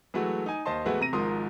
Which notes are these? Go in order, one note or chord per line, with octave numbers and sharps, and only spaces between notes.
E3 F#3 G#3 A3 F#4
D#4 G#5
D#2 C5 D#5 A5 C6
E3 G#3 A3 B3 E4 F#4
C3 A#5 A#6 D#7
G#1 G#2 F3 A#4 C6 D#6